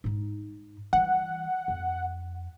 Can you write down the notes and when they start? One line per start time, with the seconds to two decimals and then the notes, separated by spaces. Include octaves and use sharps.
0.04 G#2 D#4
0.93 E3 G3 F#5
1.68 F2